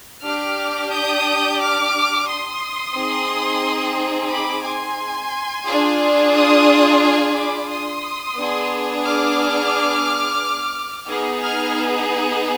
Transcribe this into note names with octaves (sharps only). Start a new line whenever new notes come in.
D4 G4 D6 F6
D#6 G6
D6 F6
C6 D#6
C4 D#4 G#4
B5 D6
G#5 C6
D4 F4 G#4
C6 D#6
G#5 C6
B5 D6
C6 D#6
B3 D4 G#4
D6 F6
B3 D#4 G#4
F6 G#6